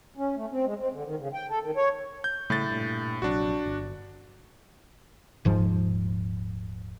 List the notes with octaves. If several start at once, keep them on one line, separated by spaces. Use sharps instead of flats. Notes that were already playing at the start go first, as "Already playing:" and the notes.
C#4
A3
C4
G#3
C4
D3
D#3
C#3
G5
A4
D#3
C#5
G6
A2 C#3 G3 A3 A6
G2 A#2
A#1 C3 F#3 D4 F#4
G1
D#1 G#2 F3